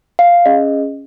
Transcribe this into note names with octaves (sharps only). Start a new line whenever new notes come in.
F5
C#4 G#4 D#5